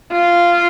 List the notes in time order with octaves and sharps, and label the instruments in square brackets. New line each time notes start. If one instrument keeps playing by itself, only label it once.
[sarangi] F4